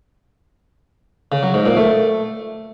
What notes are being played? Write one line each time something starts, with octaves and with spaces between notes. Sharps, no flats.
C#3
F#3
G#2
A#2
A3